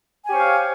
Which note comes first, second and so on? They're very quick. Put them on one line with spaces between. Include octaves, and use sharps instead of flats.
G#5 G4 C#5 C5 F5